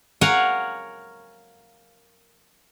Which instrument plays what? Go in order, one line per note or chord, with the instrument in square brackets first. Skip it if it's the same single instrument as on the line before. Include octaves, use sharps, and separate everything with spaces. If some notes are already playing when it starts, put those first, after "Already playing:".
[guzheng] A#4 C#5 F5 F#5 G#5